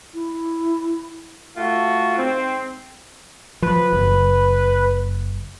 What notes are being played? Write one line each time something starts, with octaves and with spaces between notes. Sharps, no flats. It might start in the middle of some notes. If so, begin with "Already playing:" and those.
E4
A3 F4 F#4
G#2 C4
F3 B4
F#1